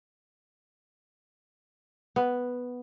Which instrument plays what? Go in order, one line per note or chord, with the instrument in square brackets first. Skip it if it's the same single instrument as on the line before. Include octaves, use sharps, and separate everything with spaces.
[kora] B3